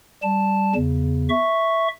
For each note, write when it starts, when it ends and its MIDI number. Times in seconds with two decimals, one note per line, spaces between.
0.23 0.74 55
0.23 0.74 81
0.75 1.28 40
0.75 1.28 49
1.29 1.88 76
1.29 1.88 85